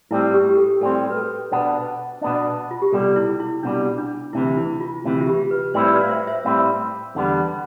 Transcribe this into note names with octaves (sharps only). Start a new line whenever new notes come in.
A2 G3 C4 E4
G4
G4
A4
A2 G3 C4 A4
B4
A4
B2 B3 D4
B2 B3 D4
F4
G4
C2 B2 G3 A4
E4
E4
C2 B2 G3 D4
D4
D2 C3 E3 E4
E4
F4
D2 C3 E3
F4
G4
B4
A2 G3 C4 E4 C5
B4 D5
F5
C5 E5
C5 E5
A2 G3 C4 E4
E2 D3 G3 B3